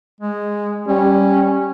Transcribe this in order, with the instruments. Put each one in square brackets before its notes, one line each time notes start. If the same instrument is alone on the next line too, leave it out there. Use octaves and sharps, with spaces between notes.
[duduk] G#3
[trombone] G3 [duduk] C#4